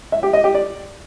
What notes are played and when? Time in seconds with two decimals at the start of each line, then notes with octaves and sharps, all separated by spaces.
0.12 E5
0.23 G4
0.33 D#5
0.44 G4
0.54 D5